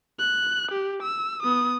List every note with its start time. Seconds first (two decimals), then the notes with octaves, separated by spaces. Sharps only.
0.19 F#6
0.72 G4
1.03 E6
1.43 B3 D#6